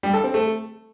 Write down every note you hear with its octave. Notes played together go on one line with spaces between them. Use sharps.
G3
A4
C4
A3